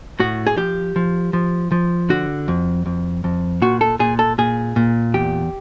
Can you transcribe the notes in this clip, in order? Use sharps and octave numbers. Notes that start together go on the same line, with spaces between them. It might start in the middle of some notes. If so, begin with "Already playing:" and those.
A2 F#4
G#4
F3 G4
F3
F3
F3
D3 F#4
F2
F2
F2
A#2 F#4
A4
A#2 G#4
A4
A#2 G#4
A#2
E2 G4